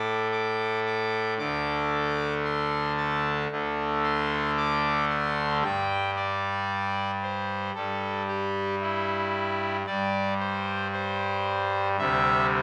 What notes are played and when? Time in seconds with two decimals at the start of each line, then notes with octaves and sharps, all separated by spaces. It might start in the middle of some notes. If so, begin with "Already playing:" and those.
Already playing: A2 A3 D6
0.32 D6
0.86 D6
1.39 D2 D3 A3 D6
2.45 C6
2.97 A5
3.51 D2 D3 A3
4.04 C6
4.57 D6
5.10 C6
5.62 G2 G3 G5
6.16 D5
7.23 C5
7.75 G2 G3 A4
8.28 G4
8.81 E4
9.86 G2 G3 D5
10.40 C5
10.93 C5
11.98 D2 C3 G3 E5